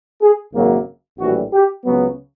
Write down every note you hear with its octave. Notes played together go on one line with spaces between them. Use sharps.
G#4
G#1 F#2 C#3 F#3 A#3
A#1 A2 E3 G3 F#4
G4
C#2 C#3 F#3 B3